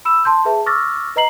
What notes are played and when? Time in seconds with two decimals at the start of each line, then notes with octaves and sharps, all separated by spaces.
0.05 B5 E6 E7
0.25 A5 C6 G6
0.45 G#4 B4 E5 A5
0.66 C#6 D6 E6 F6 A6 A#6
1.16 B4 D#5 A#5 C7 F#7